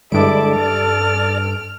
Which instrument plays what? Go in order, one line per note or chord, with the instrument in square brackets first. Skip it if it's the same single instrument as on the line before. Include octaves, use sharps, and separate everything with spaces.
[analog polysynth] G2 D7 [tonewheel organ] D3 G3 G#3 [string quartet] E4 D6 [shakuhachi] A4
[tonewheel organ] D5 [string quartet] F6